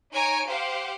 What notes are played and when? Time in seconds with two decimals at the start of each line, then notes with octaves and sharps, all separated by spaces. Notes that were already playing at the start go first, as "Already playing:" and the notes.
0.12 D#4 C#5 G#5 A#5 D7
0.47 G4 C5 F5 F#5